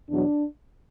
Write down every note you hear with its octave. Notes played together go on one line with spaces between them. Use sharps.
E2 B2 F#3 D4